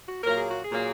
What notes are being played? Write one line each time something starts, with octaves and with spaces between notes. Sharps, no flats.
F#4
A#2 F#3 A#3 A#4
G#4
F#4
G#4
A#2 F#3 A#3